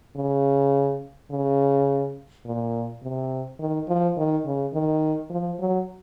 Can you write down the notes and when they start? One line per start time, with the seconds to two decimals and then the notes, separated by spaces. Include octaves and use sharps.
0.16 C#3
1.30 C#3
2.46 A#2
3.02 C3
3.60 D#3
3.88 F3
4.17 D#3
4.45 C#3
4.74 D#3
5.30 F3
5.60 F#3